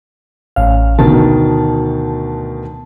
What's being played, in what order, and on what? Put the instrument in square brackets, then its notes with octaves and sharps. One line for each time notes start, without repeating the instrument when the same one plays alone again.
[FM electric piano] A1 F5 [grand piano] C#4
[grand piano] D2 B2 D#3 [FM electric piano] A5